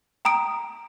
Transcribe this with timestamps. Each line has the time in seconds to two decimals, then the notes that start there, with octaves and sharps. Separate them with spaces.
0.25 G5 A#5 D#6 D7